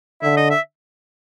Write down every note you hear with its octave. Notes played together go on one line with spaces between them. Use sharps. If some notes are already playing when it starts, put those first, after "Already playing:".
D3 E5
D#5
E5